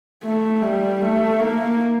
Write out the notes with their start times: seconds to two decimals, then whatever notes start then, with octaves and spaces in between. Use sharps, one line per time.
0.24 A3
0.62 G3
1.01 A3
1.40 A#3